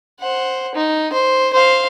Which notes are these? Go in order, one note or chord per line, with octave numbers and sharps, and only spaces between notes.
C5 F#5
D#4
C5
C5 F5